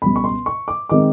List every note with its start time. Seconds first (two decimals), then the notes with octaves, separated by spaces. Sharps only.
0.02 C#2 B2 G3 B5
0.16 C#6
0.24 C6
0.46 C#6
0.68 D6
0.89 D#3 G#3 C4 D6